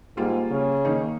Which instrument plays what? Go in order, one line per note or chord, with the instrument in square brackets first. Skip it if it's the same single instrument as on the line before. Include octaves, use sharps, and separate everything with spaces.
[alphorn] G#2 [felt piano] G3 A#3 F4
[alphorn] C#3
[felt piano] D#3 A#3 D#4